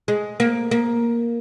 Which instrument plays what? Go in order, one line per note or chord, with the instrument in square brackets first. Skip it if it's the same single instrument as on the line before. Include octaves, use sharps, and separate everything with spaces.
[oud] G#3
A#3
A#3